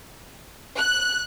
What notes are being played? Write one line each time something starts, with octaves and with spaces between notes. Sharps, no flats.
F#6